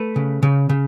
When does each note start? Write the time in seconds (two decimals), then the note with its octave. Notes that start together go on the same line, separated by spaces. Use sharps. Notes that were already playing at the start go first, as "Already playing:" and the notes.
Already playing: A3 B4
0.16 C#3
0.43 C#3
0.69 C#3